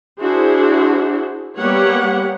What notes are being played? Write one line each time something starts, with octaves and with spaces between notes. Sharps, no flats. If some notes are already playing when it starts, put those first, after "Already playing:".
D4 E4 F#4 G#4 C5
G3 A#3 B3 G4 C#5 F#5